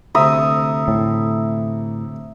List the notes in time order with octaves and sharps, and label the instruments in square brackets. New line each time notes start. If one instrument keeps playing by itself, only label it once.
[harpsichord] D2 C3 [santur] E5 A#5 D#6
[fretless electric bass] A2